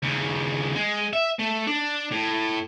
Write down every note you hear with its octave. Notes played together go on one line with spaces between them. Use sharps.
D#2 C#3
G#3
E5
A3
D4
A2